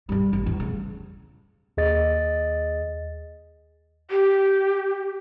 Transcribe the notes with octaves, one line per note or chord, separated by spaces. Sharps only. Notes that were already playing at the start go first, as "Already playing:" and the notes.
G2 G3
A1
E2
C#3
D#2 G#4 D#5 A6
G4